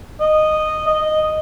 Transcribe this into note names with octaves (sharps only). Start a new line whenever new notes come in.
D#5
D#5